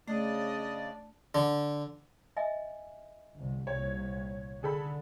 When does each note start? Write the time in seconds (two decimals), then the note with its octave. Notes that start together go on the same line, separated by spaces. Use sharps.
0.08 C#3 A3 D4 D5 D#5
1.35 D3
2.37 D#5 E5 G#5
3.35 G1 C2
3.67 C2 A#2 C#5
4.63 D3 G#4 A4 B5